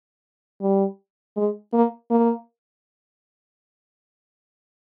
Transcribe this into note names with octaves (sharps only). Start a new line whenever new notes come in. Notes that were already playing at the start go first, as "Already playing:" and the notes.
G3
G#3
A#3
A#3